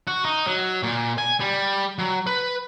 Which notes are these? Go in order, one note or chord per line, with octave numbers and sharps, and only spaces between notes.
F#4
D#4
F#3
A#2
G#5
G3
F#3
B4